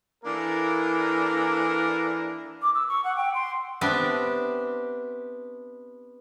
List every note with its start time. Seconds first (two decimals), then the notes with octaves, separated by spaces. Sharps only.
0.24 E3 A#3 D4 A4 A#4
2.62 D6
2.75 E6
2.88 C#6
3.04 F#5
3.16 G5
3.34 C6
3.81 B3 C4 D4 G4 E5